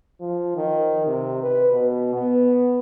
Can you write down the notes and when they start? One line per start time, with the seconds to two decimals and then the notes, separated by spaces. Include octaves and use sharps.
0.21 F3
0.56 D#3
1.07 C3
1.42 B4
1.72 B2
2.14 B3